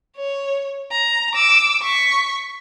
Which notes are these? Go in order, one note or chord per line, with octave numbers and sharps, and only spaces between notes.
C#5
A#5
D6 E6
C#6 B6